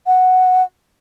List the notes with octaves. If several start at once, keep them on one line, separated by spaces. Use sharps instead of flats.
F#5